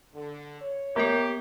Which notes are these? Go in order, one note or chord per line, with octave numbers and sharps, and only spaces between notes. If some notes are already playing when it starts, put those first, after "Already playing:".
D3
C#5
A#3 B3 G4 A#4